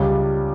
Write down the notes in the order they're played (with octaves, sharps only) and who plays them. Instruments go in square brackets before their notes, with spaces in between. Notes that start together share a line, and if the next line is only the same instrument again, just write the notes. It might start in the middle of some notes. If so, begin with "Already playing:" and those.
Already playing: [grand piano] C#2 C#3 G3